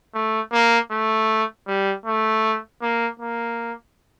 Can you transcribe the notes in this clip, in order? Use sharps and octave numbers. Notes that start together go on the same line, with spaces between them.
A3
A#3
A3
G3
A3
A#3
A#3